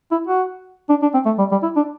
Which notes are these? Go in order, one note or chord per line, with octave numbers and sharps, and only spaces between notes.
E4
F#4
D4
D4
C4
A3
G3
G3
E4
D4